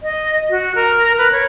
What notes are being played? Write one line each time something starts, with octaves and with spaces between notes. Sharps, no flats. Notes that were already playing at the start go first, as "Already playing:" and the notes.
D#5
F#4
A#4
B4
C#5